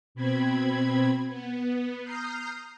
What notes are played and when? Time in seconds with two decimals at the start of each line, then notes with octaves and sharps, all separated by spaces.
0.15 B2 C4 B5 G#6
1.28 B3
2.03 A#5 D#6 F6 G6 C7